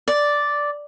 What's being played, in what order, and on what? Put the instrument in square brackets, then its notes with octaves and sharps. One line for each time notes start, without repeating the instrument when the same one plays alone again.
[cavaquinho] D5